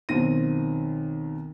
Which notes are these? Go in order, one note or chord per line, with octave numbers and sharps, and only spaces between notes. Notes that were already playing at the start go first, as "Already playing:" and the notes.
B1 D#3 C4 A#6 D#7